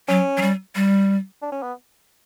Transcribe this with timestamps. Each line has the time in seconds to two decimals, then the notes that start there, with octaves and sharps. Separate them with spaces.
0.08 F#3 C#4
0.37 F#3
0.42 G3
0.76 G3
1.42 D4
1.52 C#4
1.62 B3